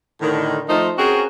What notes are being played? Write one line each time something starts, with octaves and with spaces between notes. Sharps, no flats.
A2 D3 D#3
F3 A3 D#4 F4 C5
C4 C#4 F#4 G#4 A#4